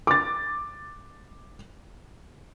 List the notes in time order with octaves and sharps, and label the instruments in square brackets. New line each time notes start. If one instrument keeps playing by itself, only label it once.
[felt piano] D6 A6